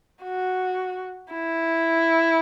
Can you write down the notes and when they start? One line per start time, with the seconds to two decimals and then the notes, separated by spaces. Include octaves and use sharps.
0.24 F#4
1.33 E4